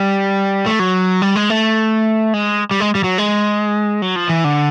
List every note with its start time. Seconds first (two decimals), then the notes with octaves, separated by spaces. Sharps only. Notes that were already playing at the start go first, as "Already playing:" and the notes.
Already playing: G3
0.66 A3
0.79 F#3
1.22 G3
1.36 G#3
1.50 A3
2.34 G#3
2.71 G3
2.80 G#3
2.95 G3
3.04 F#3
3.18 G#3
4.02 F#3
4.16 F3
4.29 E3
4.44 D3